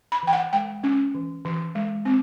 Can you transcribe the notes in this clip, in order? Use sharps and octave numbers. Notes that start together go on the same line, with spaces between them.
B5
E3 G5
F#5
G#3 G5
C#4
E3
E3
G#3
C4